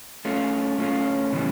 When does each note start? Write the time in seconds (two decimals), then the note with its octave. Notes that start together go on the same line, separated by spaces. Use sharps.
0.25 A3 C#4 F4
0.78 A3 C#4 F4
1.32 C#3 E3 G3 B3